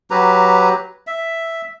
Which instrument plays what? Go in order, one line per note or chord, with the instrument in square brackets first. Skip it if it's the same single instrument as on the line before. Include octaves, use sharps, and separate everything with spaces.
[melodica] F#3 G4 B4 A#5
E5